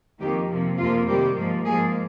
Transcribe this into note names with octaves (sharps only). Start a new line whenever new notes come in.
F2 D#3 A#3 G4
C3 F3 A#3
F2 C3 F3 A#3 F4
C3 D#3 G3 A#3 G4
G#2 F3 A#3
G#2 F3 A#3 G#4